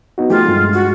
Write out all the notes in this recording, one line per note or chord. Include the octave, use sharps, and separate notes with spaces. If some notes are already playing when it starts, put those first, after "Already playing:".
B3 D#4 F#4
F3 A3 F4 G4
G2 G#3
F#4